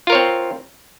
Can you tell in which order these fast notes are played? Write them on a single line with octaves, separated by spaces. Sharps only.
F4 A#4 C#5 C4